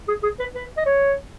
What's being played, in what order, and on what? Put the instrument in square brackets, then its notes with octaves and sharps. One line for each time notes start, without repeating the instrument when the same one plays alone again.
[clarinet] G#4
G#4
B4
B4
D#5
C#5